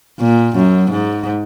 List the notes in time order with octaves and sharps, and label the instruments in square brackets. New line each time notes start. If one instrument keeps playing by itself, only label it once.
[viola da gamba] A#2
F#2
G#2